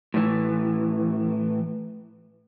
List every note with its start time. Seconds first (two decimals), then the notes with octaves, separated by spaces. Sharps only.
0.14 A2 E3